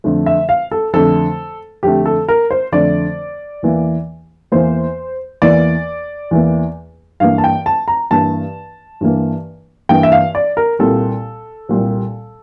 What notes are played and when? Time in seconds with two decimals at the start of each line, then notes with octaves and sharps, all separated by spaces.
0.04 F2 D3 A3
0.26 E5
0.49 F5
0.71 A4
0.93 F2 D3 A3 A4
1.83 F2 D3 A3 G4
2.06 A4
2.28 A#4
2.51 C5
2.72 F2 D3 A3 D5
3.63 E2 E3 A#3
4.52 E2 E3 A#3 C5
5.42 E2 E3 A#3 D5
6.31 E2 E3 A#3
7.20 G2 E3 A#3 F5
7.38 A5
7.44 G5
7.66 A5
7.88 A#5
8.10 G2 E3 A#3 A5
9.01 G2 E3 A#3
9.89 G2 E3 A#3 G5
10.03 E5
10.12 F5
10.35 D5
10.57 A#4
10.79 C2 A#2 G3 A4
11.69 C2 A#2 G3